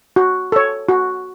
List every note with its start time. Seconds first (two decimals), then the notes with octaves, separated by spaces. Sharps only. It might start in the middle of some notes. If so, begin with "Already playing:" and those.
0.16 F#4
0.52 A4 C#5
0.89 F#4